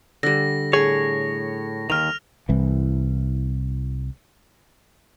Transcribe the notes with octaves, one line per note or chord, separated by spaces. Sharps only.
D3 G3 A#6
A2 G#4 C#5
D#2 G#2 D#3 F6 F7
C2 E3